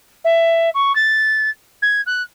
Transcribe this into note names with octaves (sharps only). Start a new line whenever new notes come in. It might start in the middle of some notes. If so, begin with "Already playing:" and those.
E5
C#6
A6
G#6
F#6